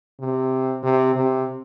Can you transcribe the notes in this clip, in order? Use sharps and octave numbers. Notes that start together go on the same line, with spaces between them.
C3
C3
C3